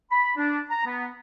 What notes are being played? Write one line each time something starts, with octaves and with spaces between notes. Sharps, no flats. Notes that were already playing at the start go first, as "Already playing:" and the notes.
B5
D4
A#5
B3